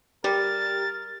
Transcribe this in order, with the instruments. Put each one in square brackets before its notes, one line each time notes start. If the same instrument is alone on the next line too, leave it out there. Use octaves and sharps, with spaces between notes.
[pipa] G3 [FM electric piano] G4 [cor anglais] A#4 [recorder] A6